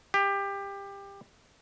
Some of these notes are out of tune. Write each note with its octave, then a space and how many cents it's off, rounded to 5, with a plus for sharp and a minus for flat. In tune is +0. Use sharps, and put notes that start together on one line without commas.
G4 +20